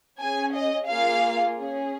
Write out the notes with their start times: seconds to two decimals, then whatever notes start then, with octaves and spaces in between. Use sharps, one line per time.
0.21 C#4 G#4 G#5
0.55 D#5
0.90 A#3 F4 G#4 F5
1.58 C#4 G#4